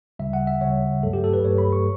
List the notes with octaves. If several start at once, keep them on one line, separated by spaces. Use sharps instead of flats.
D2 C#3 G3 E5
F#5
E5
D2 C#3 G3 C#5
G2 F#3 A3 A4
G4
A4
B4
G2 F#3 A3 C#5
B5
C#6